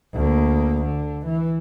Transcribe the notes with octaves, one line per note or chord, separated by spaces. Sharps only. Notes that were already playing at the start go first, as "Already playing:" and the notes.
D2 A#3
D3
E3